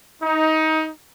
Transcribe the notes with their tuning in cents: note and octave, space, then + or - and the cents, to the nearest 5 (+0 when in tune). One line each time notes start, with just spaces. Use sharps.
D#4 +20